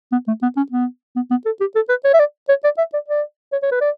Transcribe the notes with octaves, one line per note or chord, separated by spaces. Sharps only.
B3
A3
B3
C#4
B3
B3
B3
A4
G4
A4
B4
C#5
E5
D5
C#5
D5
E5
D5
D5
C#5
C#5
B4
D5